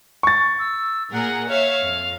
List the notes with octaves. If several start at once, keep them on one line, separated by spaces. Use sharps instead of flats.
C#6 A6
E6
A#2 G#4 A#4 F#5
C#5 E5 F5
F2